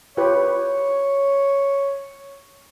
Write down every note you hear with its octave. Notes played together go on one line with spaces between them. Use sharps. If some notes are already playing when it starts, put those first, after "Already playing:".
F4 G4 B4 C#5